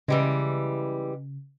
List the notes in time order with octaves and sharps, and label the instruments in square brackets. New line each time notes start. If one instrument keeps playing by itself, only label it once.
[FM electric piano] C#3 [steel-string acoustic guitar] E3 G3 G#3